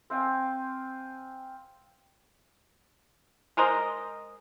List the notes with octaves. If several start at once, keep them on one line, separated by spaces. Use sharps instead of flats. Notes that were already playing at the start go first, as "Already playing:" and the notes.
C4 F5 G5 G#5
G#3 A#4 C5 D#5